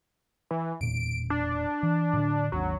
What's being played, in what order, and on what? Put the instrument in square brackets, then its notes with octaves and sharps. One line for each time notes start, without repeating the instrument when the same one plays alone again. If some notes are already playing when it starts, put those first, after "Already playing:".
[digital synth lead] E3
[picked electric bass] E1 A#2 [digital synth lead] D7
[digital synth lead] D4
[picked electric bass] E3
A2 D3
[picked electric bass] G#1 D#2 D4 [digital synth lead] F#3